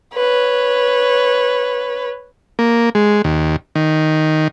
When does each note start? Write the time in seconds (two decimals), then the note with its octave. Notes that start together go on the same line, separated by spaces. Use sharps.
0.14 B4 C#5
2.59 A#3
2.95 G#3
3.24 D#2
3.75 D#3